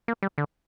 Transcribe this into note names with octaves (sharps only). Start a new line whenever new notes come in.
A#3
G3
D3